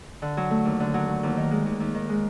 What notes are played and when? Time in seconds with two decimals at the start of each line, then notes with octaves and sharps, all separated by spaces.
0.22 D3
0.37 F#3
0.51 A3
0.65 D#2
0.80 D3
0.94 F#3
1.08 A3
1.23 D#2
1.37 D#3
1.51 G#3
1.66 D#2
1.80 D#2
1.95 D#3
2.09 G#3